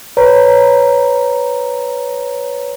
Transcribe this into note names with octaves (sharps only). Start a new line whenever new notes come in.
B4 C#5 A#5